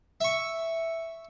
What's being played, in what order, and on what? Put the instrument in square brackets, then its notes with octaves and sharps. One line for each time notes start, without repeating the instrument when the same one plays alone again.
[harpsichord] E5 C#6